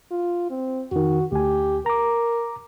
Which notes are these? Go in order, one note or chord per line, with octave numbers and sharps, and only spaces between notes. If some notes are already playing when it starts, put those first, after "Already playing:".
F4
C4
F2 D#3 F#4
D2 G4 G#5
A#4 A#5 D6